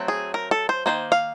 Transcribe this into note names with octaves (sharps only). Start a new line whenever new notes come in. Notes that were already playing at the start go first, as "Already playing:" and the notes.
Already playing: F#3 A3 C4
G#4
A#4
A4
C5
D#3 F#3 A#3 C5
F5